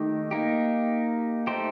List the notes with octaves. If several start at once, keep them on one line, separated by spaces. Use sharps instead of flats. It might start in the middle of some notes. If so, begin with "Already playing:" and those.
Already playing: D#3 A3 D#4 G4
A#3 D#4 G4
A3 D#4 G4 C5